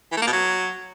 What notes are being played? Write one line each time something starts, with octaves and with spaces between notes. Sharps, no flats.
E3
A3
A#3
B2
F#3